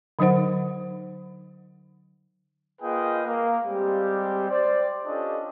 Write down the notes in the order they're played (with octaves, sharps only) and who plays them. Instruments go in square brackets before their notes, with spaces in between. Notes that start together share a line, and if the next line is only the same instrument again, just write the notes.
[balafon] D3 F#3 D#4 C5 F#5
[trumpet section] A#3 F4 G#4 B4 D#5 G5
A#3
G3 G#3 C4 G4
C5 D5
C#4 D4 F4 G4 A4 D#5